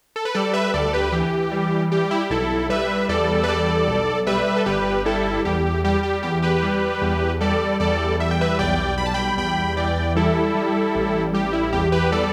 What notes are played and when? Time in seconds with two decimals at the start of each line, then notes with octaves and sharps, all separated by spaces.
0.16 A4
0.25 B4
0.35 G3 A4 D5
0.53 B4 E5
0.74 D2 A4 D5
0.93 G4 B4
1.12 E3 G4
1.52 G3
1.92 G3 G4
2.11 E4
2.21 G4
2.30 B1 E4 A4
2.69 G3 B4 E5
3.09 E2 A4 D5
3.44 B4
3.48 G3 A4 D5
3.88 B1
4.27 G3 B4 E5
4.56 A4
4.66 G1 G4 B4
5.05 G3 E4 A4
5.45 E2 G4
5.84 G3 G4
6.03 G4
6.23 E2 G4
6.42 G4 B4
6.62 G3
7.02 E2
7.41 G3 A4 D5
7.80 E2 A4 D5
8.19 G3 E5
8.31 G5
8.41 B4 E5
8.59 B1 D5 G5
8.98 G3 B5
9.06 A5
9.14 G5 B5
9.37 E2 G5 B5
9.77 E3 D5 G5
10.15 G3 E4 A4
10.55 G3
10.95 A1
11.33 G3 G4
11.53 E4
11.73 E2 G4
11.92 G4 B4
12.12 G3 A4 D5